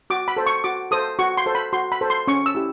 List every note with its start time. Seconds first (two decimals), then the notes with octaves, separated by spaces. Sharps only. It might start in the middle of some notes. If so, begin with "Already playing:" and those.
0.10 F#4 D6
0.28 B5
0.36 A4 C5
0.46 C#6
0.64 F#4 D6
0.91 A4 C5 D#6
1.19 F#4 C#6
1.37 C6
1.46 A4 C5
1.55 B5
1.73 F#4 C6
1.92 B5
2.01 A4 C5
2.10 C6
2.27 C#4 C#6
2.46 E6
2.55 E4 G4